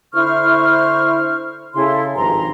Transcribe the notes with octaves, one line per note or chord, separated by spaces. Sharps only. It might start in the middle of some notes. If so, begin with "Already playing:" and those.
D3 E4 C5 C#6 F6
C#3 E4 A4 C6
G#1 G2 F3 A#5 C6